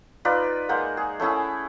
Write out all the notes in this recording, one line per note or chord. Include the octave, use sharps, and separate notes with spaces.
D#4 F4 B4 D5
G#3 A#3 C5 F#5
G#4
A3 C#4 E4 G#4